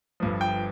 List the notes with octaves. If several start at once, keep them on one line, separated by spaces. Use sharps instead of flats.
G1 G2 F3
G5